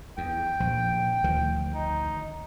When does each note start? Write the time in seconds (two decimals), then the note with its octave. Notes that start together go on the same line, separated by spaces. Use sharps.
0.18 E2 G5
0.60 A#1 F3
1.24 D2 D#3 F3
1.75 D#4